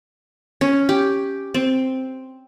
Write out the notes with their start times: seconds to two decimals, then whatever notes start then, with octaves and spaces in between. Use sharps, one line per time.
0.61 C#4
0.89 G4
1.54 C4